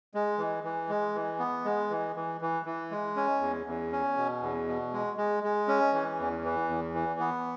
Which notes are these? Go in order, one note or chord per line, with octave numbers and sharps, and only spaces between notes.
G#3
E3
E3
G#3
E3
B3
G#3
E3
E3
E3
E3
G#3
C#4
E2
E2
C#4
B2
E2
B2
G#3
G#3
G#3
C#4
E3
E2
E3
E2
E3
B3